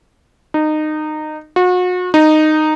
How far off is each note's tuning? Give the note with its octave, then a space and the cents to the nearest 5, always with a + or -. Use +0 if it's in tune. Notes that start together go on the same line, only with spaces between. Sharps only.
D#4 -20
F#4 -35
D#4 -10